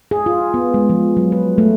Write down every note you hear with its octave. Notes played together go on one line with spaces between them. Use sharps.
G#4
F4
B3
G#3
F3
F#3
B4
A3